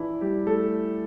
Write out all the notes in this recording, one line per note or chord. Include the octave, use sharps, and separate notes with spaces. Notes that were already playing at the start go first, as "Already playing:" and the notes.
Already playing: A#2 E3 F3 D4 E4
G3 G4
A3 A4